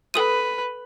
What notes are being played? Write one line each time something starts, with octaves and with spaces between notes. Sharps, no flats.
A4 B4 D#6 D#7